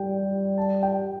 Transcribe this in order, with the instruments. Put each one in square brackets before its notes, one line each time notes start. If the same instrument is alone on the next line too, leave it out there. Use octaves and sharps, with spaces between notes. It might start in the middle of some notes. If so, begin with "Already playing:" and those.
Already playing: [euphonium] G3 [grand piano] G5
[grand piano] A5
G5